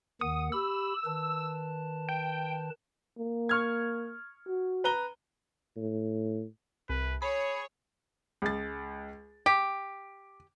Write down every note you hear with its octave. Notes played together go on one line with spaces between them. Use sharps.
D#2 D#3 F#5 D#6
G4 B5 E6
D#3 B4 A5
G5
A#3
C#6 F6 G#6
F#4
B4 A#5 G7
A2
C2 B4
G#4 C#5 B5
C#2 A6
G4 D6